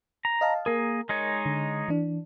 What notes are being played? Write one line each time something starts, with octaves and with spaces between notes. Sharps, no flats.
A#5
D#5 F5 A5
A#3 G#4 A#4
G#3 D#4 C#5
D3
E3 D4